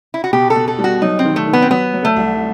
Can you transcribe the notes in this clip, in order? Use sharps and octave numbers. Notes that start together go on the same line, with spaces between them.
E4
F#4
B2 G4
A4
B2
A4
G3
F#4
F#3 D#4
C4
D#3
A3
D#3
B3
C4
F#3 B3
F#3
A3
C2